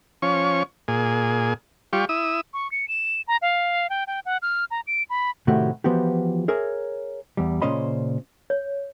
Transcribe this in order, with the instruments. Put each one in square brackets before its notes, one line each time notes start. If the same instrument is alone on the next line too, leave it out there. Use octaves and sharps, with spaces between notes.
[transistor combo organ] F3 C#4 C#6
A#2 G#4
G3 F4 G4 C#6
E4 D#6 E6
[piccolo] C#6
C#7
E7
A#5
F5
G5
G5
F#5
F6
A#5
D7
B5
[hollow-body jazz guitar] A2 C3 D#3 A3 F#4 G4
E3 F3 B3 F#4 G4
G#4 A#4 C#5 E5
E2 G3
A#2 C#3 C#4 C5 D#5 B5
[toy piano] C#5